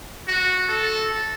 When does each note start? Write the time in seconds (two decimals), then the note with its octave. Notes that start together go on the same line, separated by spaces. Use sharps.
0.28 F#4
0.69 A4